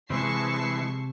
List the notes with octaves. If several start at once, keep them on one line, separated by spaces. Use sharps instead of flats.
C3 E3 G#3 C5 A5 C#6 C7